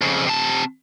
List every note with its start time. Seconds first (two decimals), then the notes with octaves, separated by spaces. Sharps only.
0.01 F2 C#3
0.26 C3 A5